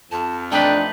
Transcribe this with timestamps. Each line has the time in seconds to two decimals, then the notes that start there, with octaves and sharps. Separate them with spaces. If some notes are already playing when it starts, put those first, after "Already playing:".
0.12 F2 A5
0.52 A3 D4 D#4 B4 G5